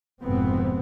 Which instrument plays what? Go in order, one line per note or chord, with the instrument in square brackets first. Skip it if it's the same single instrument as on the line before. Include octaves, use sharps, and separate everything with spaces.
[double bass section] F1 F2 G#2 B2 B3 C4